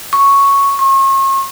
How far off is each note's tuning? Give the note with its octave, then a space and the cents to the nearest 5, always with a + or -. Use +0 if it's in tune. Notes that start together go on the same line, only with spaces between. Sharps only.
C#6 +0
C#6 -40